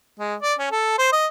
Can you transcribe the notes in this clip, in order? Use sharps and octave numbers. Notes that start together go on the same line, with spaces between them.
G#3
D5
C#4
A4
C5
D#5